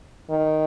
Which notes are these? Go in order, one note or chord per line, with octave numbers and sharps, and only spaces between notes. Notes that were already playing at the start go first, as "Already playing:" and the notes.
D#3